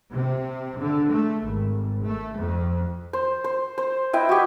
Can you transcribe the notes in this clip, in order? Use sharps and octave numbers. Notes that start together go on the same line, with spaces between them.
C3
D3
A3
G#1
A3
F2
C5
C5
C5
E4 B4 D#5 G5
F#4 G4